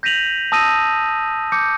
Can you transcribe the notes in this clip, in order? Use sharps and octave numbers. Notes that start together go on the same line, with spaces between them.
G6 A#6 B6 D#7 F7 F#7
A5 D#6 E6 A#6 D#7
D6 G6 C#7